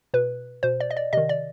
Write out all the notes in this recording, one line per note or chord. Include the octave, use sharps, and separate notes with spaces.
B2 B4
B2 C5
D5
D#5
D5
C3 D#3 D#5
D5